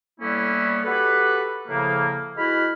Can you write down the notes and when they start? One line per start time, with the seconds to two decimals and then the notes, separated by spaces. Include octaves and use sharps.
0.20 A2 G3 A#3 B3 C#4 E4
0.85 F#4 G4 A4 B4
1.68 A2 C#3 F3 A#3
2.37 G#3 E4 F#4 B4 B5 F6